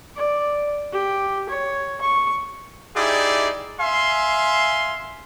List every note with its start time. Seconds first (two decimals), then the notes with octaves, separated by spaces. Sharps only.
0.16 D5
0.93 G4
1.49 C#5
2.01 C#6
2.96 D#4 E4 G4 G#4 D5
3.79 E5 F5 G#5 C6